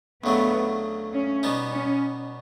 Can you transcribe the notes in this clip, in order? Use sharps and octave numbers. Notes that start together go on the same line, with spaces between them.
D2 C#3 F#3 A3 B3
C#4
B2 G3 B3 D#4
C#4